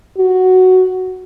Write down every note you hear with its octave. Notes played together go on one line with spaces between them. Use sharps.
F#4